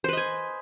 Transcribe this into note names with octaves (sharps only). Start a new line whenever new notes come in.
B4 C5 D#5 G#5